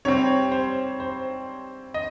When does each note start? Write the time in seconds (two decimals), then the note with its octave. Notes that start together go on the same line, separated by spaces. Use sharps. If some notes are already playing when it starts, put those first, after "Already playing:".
0.05 C3 G3 C4 C#5
0.52 C5
1.00 C5
1.94 D#5